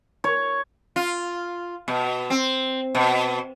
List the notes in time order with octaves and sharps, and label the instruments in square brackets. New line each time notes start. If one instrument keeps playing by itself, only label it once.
[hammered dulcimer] C#5
[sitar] F4
B2
C4
B2